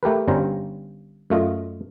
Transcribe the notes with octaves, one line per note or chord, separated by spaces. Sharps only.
A3 G4 A#4 B4
G1 G2 G3 C#4 C5 A#5
F#2 A3 F4 D#5